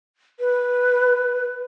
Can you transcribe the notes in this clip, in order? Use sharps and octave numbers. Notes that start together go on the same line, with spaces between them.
B4